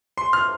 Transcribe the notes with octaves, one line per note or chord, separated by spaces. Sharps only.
C6
F6